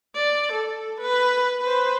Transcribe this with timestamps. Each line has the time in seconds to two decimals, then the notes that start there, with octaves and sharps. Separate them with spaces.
0.15 D5
0.52 A4
1.01 B4
1.62 B4 C5